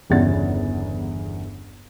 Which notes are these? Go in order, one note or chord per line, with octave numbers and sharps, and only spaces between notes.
G1 E2 C#3 F#5 A6